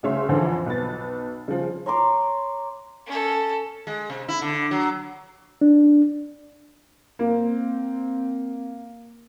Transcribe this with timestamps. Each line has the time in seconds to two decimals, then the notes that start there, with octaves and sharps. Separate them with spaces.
0.03 D2 C#3 C#5 E5 C6
0.29 F2 D3 E3 F3
0.66 B1 B4 A6
1.48 C#3 F3
1.86 C#5 A#5 C6 D6
3.07 C#4 A4
3.87 G#3
4.10 C3
4.28 E4
4.42 D3
4.71 F#3
5.61 D4
7.19 A#3 C4